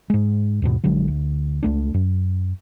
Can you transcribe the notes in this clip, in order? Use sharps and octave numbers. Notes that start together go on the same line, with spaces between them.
G#2 G#3
D#2 G#2 B2
A#1 D3 F#3 G#3
D2
C#2 A3 D4
F#2